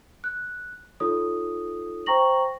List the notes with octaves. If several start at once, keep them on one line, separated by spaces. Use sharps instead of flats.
F#6
D#4 F4 A4 C#5 D#6
C5 G5 A#5 C#6 A#6 F#7